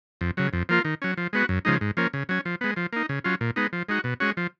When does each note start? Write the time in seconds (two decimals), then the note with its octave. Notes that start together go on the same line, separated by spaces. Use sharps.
0.21 F2
0.37 C#3 F#3
0.53 F2
0.69 F3 A#3 F4
0.85 D#3
1.02 F#3 C#4
1.17 F3
1.33 G#3 B3 F#4
1.49 F#2
1.65 C#3 F3 G#3 D#4
1.81 G#2
1.97 F3 A#3 C#4
2.13 C#3
2.29 F#3 C#4
2.45 F3
2.61 G#3 B3
2.76 F3
2.93 A#3 D#4
3.09 C#3
3.24 F#3 C#4 F4
3.41 A#2
3.56 G#3 B3 D#4
3.73 F3
3.89 G#3 D#4 F#4
4.04 B2
4.20 G#3 C#4 F#4
4.37 F3